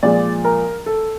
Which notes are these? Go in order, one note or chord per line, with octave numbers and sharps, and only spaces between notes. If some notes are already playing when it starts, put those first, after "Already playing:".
A#2 F3 G#3 D5
A#4
A4